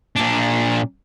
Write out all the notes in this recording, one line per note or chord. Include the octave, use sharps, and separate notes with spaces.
A#2 D4